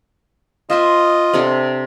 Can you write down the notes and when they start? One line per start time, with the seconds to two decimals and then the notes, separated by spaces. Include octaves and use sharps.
0.70 F4 C5 D#5 E5 C6
1.34 C3 D4 A4